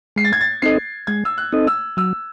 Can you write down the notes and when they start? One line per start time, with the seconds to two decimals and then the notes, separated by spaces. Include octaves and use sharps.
0.16 G#3 C7
0.24 A6
0.33 G#6
0.41 A6
0.62 C4 D#4 A4 D#5 C7
1.07 G#3 G#6
1.25 E6
1.38 F#6
1.52 C4 D#4 A4 D#5
1.67 E6
1.97 F#3 E6